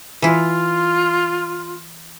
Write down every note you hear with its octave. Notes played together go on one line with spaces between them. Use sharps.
E3 E4 F4